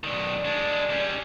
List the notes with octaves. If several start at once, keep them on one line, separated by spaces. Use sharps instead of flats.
B1 D#3 D5
G#3 D4
G3 C#4